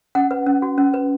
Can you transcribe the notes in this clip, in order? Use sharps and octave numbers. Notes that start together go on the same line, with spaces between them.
C#4 F#5
B4
C#4
F#4
C#4
B4